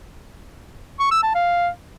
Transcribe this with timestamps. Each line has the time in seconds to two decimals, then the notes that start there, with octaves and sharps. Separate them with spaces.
1.00 C#6
1.12 E6
1.23 A5
1.35 F5